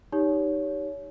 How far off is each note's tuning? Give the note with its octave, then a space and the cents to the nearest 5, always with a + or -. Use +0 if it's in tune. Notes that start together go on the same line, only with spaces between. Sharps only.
D#4 +0 G4 +0 C#5 +25